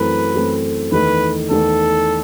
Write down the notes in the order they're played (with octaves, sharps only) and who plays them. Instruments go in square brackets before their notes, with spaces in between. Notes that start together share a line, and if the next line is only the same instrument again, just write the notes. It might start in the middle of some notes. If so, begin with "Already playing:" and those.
Already playing: [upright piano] F#2 E3 A3 C4 [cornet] B4
[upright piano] F#2 E3 A3 C4
[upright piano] E2 D#3 A3 [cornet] B4
[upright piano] E2 D#3 A3 [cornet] A4